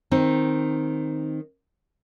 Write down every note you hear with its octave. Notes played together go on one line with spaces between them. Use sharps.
D#3 C4 D#4